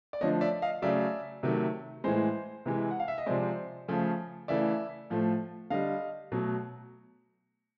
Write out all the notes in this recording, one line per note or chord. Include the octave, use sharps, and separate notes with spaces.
D5
D3 F3 A3 C#5 D#5
D5 E5
D#5 F5
C#3 F#3 A3 D5 E5
C3 D#3 F#3 A3
A2 E3 G#3 C5
C3 E3 G#3
F#5
F5
E5
D#5
C3 F3 G#3 C5 D5
C#3 F3 A3
C#3 E3 A3 D5 E5
A2 F3 A3
D3 G3 D#5 F5
B2 F#3 A3